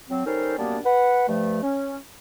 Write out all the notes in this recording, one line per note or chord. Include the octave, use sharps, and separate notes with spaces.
F#3 C4
G3 C#4 D#4 A4 A#4 C5
F#2 G3 A#3 B3 D4
B4 F#5
G2 F3 A3
C#4